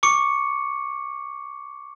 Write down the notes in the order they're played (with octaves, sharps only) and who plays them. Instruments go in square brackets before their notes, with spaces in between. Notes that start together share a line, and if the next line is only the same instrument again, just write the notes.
[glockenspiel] C#6 D6 C#7